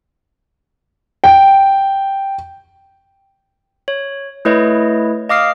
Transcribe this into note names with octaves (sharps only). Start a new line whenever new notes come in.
G5
C#5
A3 E4 B4 C#5 D#5
D#5 F5 D6 D#6 F6 C7